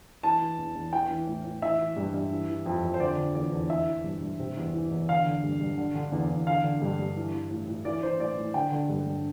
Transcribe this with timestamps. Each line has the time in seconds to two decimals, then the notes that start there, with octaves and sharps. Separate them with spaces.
0.23 E3 A5
0.41 E3
0.58 E2
0.75 E2
0.93 E3 G5
1.09 E3
1.27 A2
1.45 A2
1.62 E3 E5
1.79 E3
1.97 G2
2.14 G2
2.32 E3
2.49 E3
2.66 F2
2.84 F2
2.94 C5
3.00 D3 D5
3.18 D3
3.35 E2 D5
3.52 E2
3.70 E3 E5
3.87 E3
4.04 G2
4.22 G2
4.39 C3
4.57 E2
4.74 E3
4.90 E2
5.08 D3 F5
5.26 D3
5.43 G2
5.60 G2
5.78 D3
5.95 D3
6.12 E2
6.30 E2
6.47 D3 F5
6.64 D3
6.82 G2
6.99 G2
7.16 E3
7.34 E3
7.51 A2
7.68 A2
7.85 E3 D5
8.03 E3 C5
8.20 A2 D5
8.38 A2
8.54 D3 G5
8.72 D3
8.89 G2
9.07 G2